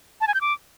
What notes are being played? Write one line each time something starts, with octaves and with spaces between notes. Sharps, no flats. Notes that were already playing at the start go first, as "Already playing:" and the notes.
A5
G#5
G6
D6